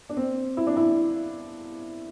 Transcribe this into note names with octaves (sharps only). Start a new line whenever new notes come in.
D4
C4
E4
D4
E4